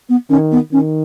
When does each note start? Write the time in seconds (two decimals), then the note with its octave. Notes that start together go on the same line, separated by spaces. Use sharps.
0.09 B3
0.30 D#3 C#4
0.52 B3
0.72 D#3 C#4